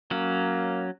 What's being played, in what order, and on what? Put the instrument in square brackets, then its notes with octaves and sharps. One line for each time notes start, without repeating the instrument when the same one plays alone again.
[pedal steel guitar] F#3 C#4 [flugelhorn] A#3